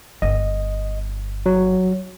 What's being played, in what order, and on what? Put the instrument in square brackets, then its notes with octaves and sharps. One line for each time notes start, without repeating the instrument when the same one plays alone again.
[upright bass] G1 [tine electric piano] D#5
[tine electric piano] F#3